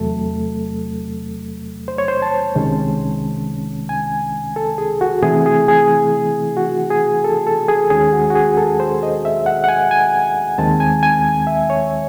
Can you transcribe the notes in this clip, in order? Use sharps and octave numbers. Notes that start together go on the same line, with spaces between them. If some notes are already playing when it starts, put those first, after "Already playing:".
Already playing: E2 C3 F#3 A3 A4
C5
C#5
C5
A5
C2 C3 D#3 G#3 C#4
G#5
A4
G#4
F#4
C3 E3 A3 C4 E4 G#4
G#4
G#4
F#4
G#4
A4
A4
G#4
D#2 D#3 G#3 C#4 G#4
F#4
F#4
G#4
A4
C5
D#5
E5
F#5
F#5
G#5
G#5
D#2 D#3 G#3 C4 A5
G#5
G#5
E5
C#5